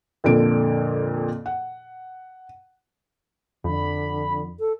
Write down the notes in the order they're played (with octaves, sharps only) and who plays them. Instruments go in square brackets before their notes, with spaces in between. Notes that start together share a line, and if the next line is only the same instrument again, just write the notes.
[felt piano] F2 A#2 D3 D7
F#5
[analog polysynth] F2 [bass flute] D3 [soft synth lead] B5
[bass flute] A4